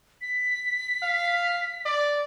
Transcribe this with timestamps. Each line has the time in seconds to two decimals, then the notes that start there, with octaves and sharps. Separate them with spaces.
0.21 B6
1.03 F5
1.86 D5